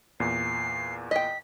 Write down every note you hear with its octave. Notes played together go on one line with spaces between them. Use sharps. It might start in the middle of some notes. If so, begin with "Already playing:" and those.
E2 A#2 C7
D#5 G5 B6